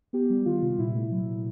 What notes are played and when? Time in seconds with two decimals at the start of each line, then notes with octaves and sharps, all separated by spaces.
0.13 B3 G4
0.30 G3
0.46 D#3 F4
0.62 C3
0.78 A#2 E4
0.95 A3
1.11 F#3
1.27 A#2